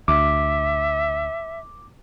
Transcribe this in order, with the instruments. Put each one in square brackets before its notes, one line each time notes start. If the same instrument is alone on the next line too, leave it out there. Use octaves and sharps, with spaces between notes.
[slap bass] D2 [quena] E5 [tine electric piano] D6